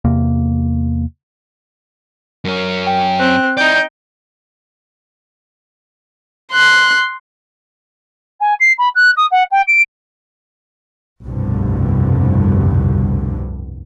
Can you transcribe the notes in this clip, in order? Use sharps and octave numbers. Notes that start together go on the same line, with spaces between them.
E2 C3 A#3
F#2 C#4 A#4
G5
C4 F#6
D#4 E4 D5 G5 G6
C6 F#6
G#5
C7
B5
F#6
D#6
F#5
G5
D7
F1 C2 G2 B2 D3